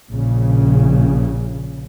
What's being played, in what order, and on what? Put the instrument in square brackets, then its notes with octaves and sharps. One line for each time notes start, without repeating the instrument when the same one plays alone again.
[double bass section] A#1 C#3